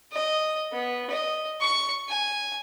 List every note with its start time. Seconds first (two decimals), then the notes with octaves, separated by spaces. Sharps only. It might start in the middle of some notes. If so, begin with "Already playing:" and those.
0.12 D#5
0.73 B3
1.10 D#5
1.61 C#6
2.09 G#5